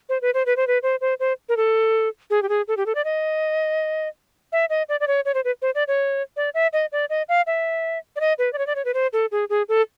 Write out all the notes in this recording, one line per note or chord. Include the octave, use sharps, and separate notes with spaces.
C5
B4
C5
B4
C5
B4
C5
C5
C5
A#4
A4
G#4
G4
G#4
A4
G4
A4
D5
D#5
E5
D#5
D5
D5
C#5
C#5
C5
B4
C5
D5
C#5
D5
E5
D#5
D5
D#5
F5
E5
D5
D#5
B4
D5
C#5
D5
C#5
B4
C5
A4
G#4
G#4
A4